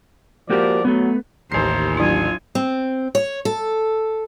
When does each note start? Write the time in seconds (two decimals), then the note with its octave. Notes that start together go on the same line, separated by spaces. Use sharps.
0.50 F3 A#3 F#4 G4 A#4 D5
0.85 F#3 A3 B3
1.52 A1 D#2 C5 A#5 C7
1.97 F#3 D4 E4 F4 G#5
2.55 C4
3.15 C#5
3.45 A4